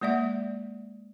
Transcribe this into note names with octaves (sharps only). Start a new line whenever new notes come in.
G#3 A#3 D5 E5 F#5